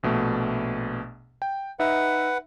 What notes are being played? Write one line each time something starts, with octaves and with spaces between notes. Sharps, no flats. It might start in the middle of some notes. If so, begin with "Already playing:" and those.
A#1 B2 A3
G5
D#4 B4 E5 F#5